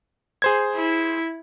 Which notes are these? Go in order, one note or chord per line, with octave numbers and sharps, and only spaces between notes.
G#4 C5 G#6
E4